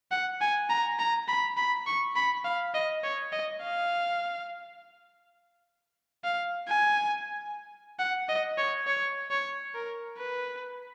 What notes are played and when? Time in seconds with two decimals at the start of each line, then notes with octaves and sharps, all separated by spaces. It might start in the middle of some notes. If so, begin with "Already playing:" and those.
0.11 F#5
0.41 G#5
0.69 A#5
0.99 A#5
1.28 B5
1.57 B5
1.86 C#6
2.16 B5
2.45 F5
2.74 D#5
3.03 C#5
3.32 D#5
3.62 F5
6.24 F5
6.68 G#5
7.99 F#5
8.29 D#5
8.58 C#5
8.87 C#5
9.31 C#5
9.74 A#4
10.18 B4